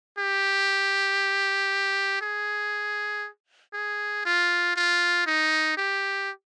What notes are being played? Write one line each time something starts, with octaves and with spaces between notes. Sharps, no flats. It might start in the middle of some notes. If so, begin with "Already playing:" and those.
G4
G#4
G#4
F4
F4
D#4
G4